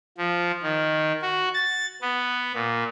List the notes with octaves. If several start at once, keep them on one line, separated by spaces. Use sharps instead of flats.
F3
D#3
F#4
A6
B3
A#2